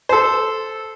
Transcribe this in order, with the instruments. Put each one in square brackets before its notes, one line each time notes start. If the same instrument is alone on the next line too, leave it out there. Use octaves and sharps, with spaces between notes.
[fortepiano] A4 C5